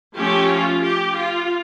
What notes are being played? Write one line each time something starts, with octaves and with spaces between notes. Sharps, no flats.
F3 A3 C#4 G4
F4
G4
F4